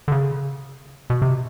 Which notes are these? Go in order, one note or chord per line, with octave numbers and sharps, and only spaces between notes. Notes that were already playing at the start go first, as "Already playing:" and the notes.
D3
C#3
B2
C3